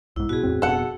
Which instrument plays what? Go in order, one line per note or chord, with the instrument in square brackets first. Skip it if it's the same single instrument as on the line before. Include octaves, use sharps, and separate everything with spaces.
[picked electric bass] B1 G#2 [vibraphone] E4
[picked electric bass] B2 [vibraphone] F#4 G#4
[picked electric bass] E2 A2 C4
[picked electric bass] F1 B2 [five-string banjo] A4 F#5